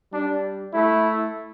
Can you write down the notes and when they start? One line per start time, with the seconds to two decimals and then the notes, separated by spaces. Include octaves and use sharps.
0.12 G3 D4
0.73 A3 E4